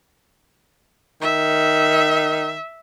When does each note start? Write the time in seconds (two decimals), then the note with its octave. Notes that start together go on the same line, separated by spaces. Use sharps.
1.22 D#3 E5